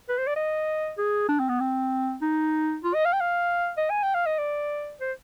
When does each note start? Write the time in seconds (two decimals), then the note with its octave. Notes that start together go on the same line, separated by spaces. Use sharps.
0.09 B4
0.18 C5
0.27 D5
0.36 D#5
0.98 G#4
1.29 D4
1.39 C4
1.49 B3
1.60 C4
2.22 D#4
2.84 F4
2.94 D#5
3.05 F5
3.13 G5
3.20 F5
3.77 D#5
3.90 G#5
4.03 G5
4.15 F5
4.26 D#5
4.39 D5
5.01 C5